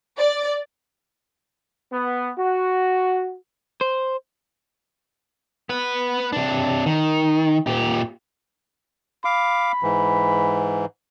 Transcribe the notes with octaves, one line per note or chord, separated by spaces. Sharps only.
D5
B3
F#4
C5
B3 B4
C3 D4
D#3
A#2 G4
F5 B5 D6
G#2 E3